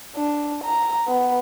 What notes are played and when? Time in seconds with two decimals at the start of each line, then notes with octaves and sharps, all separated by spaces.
0.16 D4
0.64 A#5
1.08 B3